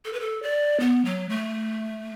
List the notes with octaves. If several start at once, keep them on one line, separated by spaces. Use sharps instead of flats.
A4
B4
A4
D5
B3
F#3
A3